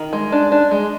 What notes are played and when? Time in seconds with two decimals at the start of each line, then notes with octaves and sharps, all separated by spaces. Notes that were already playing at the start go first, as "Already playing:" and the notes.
Already playing: D#3
0.13 G#3
0.32 D4
0.52 D4
0.71 G#3